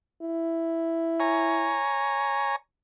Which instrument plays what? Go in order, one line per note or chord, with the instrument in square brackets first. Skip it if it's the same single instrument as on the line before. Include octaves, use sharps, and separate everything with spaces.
[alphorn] E4
[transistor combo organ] C#5 G#5 A#5